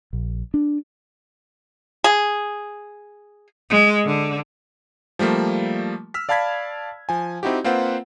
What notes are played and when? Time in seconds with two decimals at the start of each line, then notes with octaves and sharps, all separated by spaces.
0.13 A#1
0.54 D4
2.04 G#4
3.70 G#3
4.05 D3
5.19 F3 G3 A3 A#3
6.14 E6 F6 B6
6.29 D5 F5 A5 B5 G#6 B6
7.09 F3 G#5
7.43 C4 D#4 E4 F#4 G4
7.64 A#3 C4 F4 B4 C5 F#5